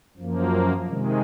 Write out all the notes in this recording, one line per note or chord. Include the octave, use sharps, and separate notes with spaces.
F#2 F3 A#3
C3 D#3 G#3